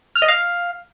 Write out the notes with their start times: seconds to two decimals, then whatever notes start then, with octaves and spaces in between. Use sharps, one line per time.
0.15 F6
0.22 D#5
0.28 F5